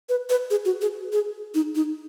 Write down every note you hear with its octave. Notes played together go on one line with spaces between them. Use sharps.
B4
B4
G#4
F#4
G#4
G#4
D#4
D#4